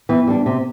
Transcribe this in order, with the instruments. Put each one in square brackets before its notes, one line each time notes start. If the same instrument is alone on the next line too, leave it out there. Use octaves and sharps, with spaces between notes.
[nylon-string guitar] E3 [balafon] B3
[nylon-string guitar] G3 D4
C3